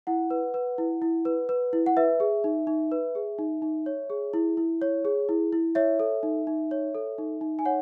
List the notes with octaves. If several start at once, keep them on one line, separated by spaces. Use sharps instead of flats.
E4 F#5
B4
B4
E4
E4
B4
B4
E4
F#5
B4 E5
G#4
D#4
D#4
B4
G#4
D#4
D#4
C#5
G#4
E4
E4
C#5
G#4
E4
E4
C#5 E5
A4
D#4
D#4
C#5
A4
D#4
D#4
G#5
C#5 F#5